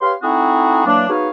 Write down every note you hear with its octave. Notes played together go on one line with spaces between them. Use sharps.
G4 B4 C#5 F5 C6
A3 C4 D#4 E4 F#4 G#4
E3 F#3 A#3 D4
B3 D#4 F#4 G#4 C#5 F5